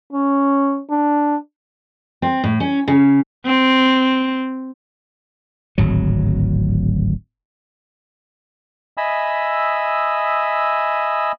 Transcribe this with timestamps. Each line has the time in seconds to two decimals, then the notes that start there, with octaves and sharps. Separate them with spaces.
0.13 C#4
0.90 D4
2.22 C4
2.44 A2
2.60 C#4
2.88 C#3
3.45 C4
5.78 D1 G#1 F#3
8.97 D#5 E5 G#5 B5 D#6 E6